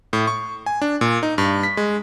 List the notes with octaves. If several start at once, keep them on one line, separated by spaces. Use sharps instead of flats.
A2
C#6
G#5
D4
A#2
D#4
G2
B6
G#3